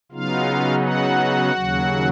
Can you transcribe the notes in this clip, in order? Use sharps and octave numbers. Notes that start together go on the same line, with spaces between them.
C#3 F#3 B3 D#4 F4 F5
F#4 F#5
D#2 C#3 F#3